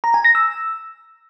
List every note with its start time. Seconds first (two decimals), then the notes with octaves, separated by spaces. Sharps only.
0.04 A#5
0.14 G#5
0.24 A#6
0.35 E6